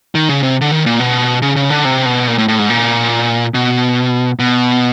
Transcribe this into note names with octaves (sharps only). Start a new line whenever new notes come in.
D#3
C#3
C3
D3
D#3
A#2
B2
C#3
C#3
D3
C3
B2
A#2
A2
A2
G#2
A#2
B2
B2